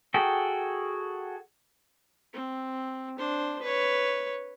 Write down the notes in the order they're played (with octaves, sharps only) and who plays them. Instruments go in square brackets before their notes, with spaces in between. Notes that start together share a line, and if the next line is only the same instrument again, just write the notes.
[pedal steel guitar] F#4 G#4 A4 G5
[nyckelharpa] C4
D4 C5
B4 C#5